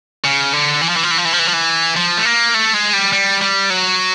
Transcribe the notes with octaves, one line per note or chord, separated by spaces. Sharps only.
C#3
D3
E3
F3
E3
F3
E3
F3
E3
F3
E3
F3
E3
F3
A3
A#3
A3
G#3
G3
G3
G3
F#3